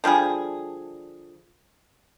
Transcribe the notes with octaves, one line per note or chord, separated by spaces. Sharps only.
D3 F3 G3 G#4